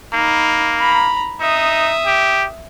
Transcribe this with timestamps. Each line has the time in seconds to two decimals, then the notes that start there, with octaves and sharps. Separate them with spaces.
0.14 A#3 D#4 B5
0.79 A#5 B5
1.40 D#4 E5 D#6
2.06 G4